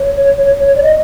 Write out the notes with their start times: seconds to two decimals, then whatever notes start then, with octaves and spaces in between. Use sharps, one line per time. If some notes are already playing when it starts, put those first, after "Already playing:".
Already playing: C#5
0.75 D5
0.83 D#5